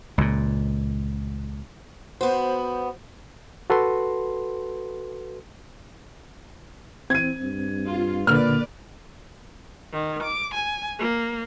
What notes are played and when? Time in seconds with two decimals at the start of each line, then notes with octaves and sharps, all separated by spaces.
0.18 C#2 A#2
2.21 B3 F#4 C5
3.70 F#4 A4 B4 C6
7.10 E3 C4 G#6 D#7
7.42 G2
7.87 F4
8.27 A#2 D3 A#3 B4 D5 F6
9.92 D#3
10.23 D6
10.54 G#5
10.99 A#3